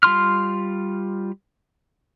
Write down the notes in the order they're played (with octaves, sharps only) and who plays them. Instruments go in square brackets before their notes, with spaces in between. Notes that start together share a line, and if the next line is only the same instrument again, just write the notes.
[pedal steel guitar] G3 F4 C6 F6